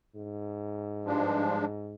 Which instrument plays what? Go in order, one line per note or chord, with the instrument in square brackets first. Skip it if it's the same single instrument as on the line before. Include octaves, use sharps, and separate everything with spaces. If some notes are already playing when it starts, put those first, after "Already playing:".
[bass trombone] G#2
[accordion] G2 F3 G#3 D4